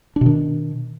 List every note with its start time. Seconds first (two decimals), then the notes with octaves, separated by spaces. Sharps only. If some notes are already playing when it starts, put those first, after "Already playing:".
0.16 D4
0.21 B2
0.26 D#3